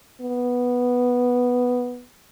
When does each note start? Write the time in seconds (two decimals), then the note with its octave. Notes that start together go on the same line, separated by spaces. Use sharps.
0.21 B3